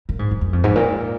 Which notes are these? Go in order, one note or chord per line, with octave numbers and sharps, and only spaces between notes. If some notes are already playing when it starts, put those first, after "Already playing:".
A#2
G#2
F#2
F#2
F2
G#2
A#2